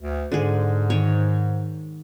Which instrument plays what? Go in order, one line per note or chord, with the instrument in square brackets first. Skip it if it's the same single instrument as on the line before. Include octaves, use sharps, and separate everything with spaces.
[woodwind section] D2
[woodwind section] G#2 [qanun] D3 G#3 G#4
[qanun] D#3 C#5